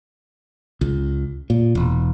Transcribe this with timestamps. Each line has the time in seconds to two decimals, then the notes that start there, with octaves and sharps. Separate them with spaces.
0.81 C#2
1.50 A#2
1.75 E1